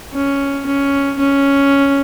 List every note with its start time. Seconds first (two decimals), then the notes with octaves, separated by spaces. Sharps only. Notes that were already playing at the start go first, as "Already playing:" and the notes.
0.14 C#4
0.66 C#4
1.19 C#4